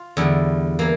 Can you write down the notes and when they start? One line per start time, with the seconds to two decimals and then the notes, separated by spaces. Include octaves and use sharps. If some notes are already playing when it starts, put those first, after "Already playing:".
Already playing: F4
0.17 E2 D3 G3
0.79 E3 A#3